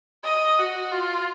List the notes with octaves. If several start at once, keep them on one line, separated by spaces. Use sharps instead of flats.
D#5
F#4
F4